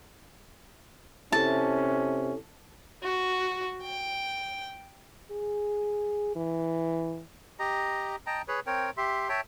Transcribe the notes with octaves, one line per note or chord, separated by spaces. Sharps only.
C3 C#4 E4 A4 A5
F#4
G5
G#4
E3
G4 D#5 A#5
D#5 G5 A5 A#5
G#4 B4 C#5
C4 A#4 C#5 G5
G4 E5 C6
C#5 E5 G5 A5